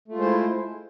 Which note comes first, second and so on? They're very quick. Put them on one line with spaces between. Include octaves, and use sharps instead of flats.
A3 F4 G#3 C5 E4